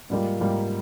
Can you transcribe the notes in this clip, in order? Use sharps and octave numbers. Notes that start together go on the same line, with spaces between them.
G#2 G3 A#3 F4
G#2 G3 A#3 F4